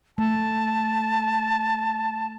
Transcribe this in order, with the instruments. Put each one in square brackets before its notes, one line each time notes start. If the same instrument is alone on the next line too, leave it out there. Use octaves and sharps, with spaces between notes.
[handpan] A3 [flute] A5